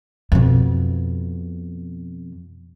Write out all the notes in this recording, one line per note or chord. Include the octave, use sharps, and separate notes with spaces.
F2 B2